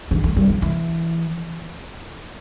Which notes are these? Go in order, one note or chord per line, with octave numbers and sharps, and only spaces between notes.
D3
A3
G3
F3
E3